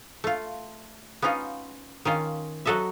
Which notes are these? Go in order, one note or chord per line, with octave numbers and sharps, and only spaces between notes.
A3 F4
B3 C#4 D#4 F4
D#3 C#4 F4
F#3 F#4 A4 D#5 E5